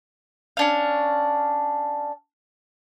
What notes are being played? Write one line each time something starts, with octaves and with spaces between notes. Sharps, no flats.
C#4 D4 F5